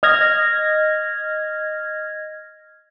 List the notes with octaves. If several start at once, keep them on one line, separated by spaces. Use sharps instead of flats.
D#5 F6 G#6 A#6